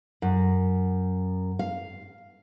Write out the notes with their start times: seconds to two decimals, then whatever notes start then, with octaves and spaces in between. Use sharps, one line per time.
0.22 F#2
1.59 F5